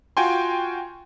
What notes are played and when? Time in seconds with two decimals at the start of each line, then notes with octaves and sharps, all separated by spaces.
0.17 F4 F#4 G5 G#5 C6